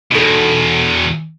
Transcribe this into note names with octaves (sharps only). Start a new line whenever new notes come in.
E2 B2 D#4 A4